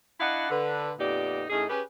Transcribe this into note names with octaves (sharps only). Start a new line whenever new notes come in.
D4 E4 D#5 F5 F#5
D3 B4
F2 A#2 B3 D#4 G4 D5
A2 C#4 D#4 G#4
C#4 G4 G#4 B4